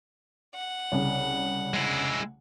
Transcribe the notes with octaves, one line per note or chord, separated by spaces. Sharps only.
F#5
C2 C#3
G#3 E4